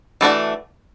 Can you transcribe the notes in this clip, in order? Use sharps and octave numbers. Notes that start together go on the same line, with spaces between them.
E3 A3 D4 F#4